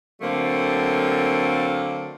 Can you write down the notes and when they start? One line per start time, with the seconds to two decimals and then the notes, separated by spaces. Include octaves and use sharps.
0.21 D3 F#3 A3 A#3 C4